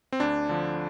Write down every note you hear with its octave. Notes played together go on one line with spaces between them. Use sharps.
C4
D2 D4
D3 F3